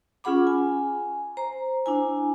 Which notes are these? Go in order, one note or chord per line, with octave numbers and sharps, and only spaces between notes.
C#4 F4 G#4 F#5 B5 D6
G#5
C5 A#5
D4 E4 G#5